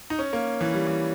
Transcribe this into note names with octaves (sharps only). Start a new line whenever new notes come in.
D#4
C#4
A#3
E3
G3
E3